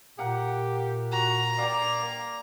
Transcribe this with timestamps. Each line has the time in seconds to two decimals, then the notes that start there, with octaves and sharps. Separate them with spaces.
0.19 A#2 G4 A#4 F5 F#5
1.12 F#4 A#5
1.58 A#3 G4 D5 F5
2.02 A#3